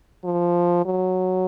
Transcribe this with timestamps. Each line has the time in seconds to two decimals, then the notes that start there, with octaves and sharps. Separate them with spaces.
0.25 F3
0.86 F#3